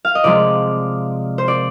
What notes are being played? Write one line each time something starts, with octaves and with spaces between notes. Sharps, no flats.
F5
D#5
C3 F3 G#3 D5
C5
D5